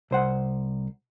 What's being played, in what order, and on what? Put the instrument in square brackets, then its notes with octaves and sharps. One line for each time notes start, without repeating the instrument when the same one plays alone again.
[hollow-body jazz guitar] C2 C5 F#5